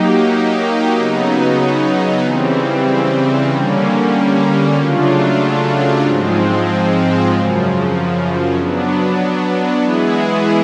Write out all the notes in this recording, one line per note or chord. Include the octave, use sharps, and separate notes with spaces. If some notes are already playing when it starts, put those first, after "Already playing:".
Already playing: F#3 A#3 D#4 G4
C#3 F#3 B3 D#4
C#3 E3 G3 C4
D3 G3 A#3 C#4
C#3 F#3 A3 D4 F4
G#2 F3 G#3 C4
F#2 C#3 F3
F#3 B3 D4
E3 G#3 B3 E4 G#4